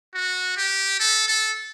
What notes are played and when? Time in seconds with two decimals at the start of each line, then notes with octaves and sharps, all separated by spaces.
0.15 F#4
0.57 G4
1.00 A4
1.28 A4